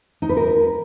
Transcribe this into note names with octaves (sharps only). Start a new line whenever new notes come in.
D#4
B4
A#4